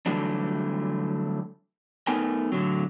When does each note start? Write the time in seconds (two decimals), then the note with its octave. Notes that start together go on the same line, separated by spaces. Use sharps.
0.06 D3 E3 F#3 G3 A3 D4
2.07 A3 B3 D#4 A#4 G5 G#5
2.52 A2 D3 F#3